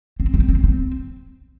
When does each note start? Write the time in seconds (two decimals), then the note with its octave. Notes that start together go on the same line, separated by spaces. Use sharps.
0.20 C4
0.34 C4
0.49 C4
0.64 C4